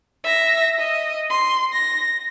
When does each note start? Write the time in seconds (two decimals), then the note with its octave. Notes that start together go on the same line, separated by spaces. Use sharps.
0.24 E5 A#6
0.79 D#5
1.30 C6
1.73 A#6